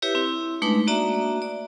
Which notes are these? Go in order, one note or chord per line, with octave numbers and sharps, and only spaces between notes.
E4 G4 B4 C#5 E5
C4 E4
G#3 A3 D4 D#4 B4 D6
A#3 D4 F#4 D5 E5 A#5
D5